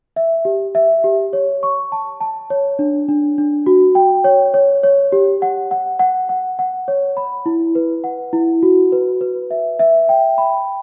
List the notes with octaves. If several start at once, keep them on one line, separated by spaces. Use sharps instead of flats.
E5
G4
E5
G4
C#5
C#6
A5
A5
C#5
D4
D4
D4
F#4
G5
C#5
C#5
C#5
G4
F#5
F#5
F#5
F#5
F#5
C#5
B5
E4
B4
F#5
E4
F#4
B4
B4
E5
E5
G5
B5